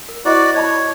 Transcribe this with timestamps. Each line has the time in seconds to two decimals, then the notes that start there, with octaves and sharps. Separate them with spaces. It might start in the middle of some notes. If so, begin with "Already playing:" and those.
0.09 A#4
0.25 E4 F#4 C5 D5 D#5
0.54 C#5 D#5 A5 B5